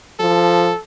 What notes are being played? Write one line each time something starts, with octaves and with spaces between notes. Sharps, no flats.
F3 A4